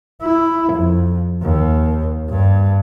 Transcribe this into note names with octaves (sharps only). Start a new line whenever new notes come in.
E4
F2
D#2
G2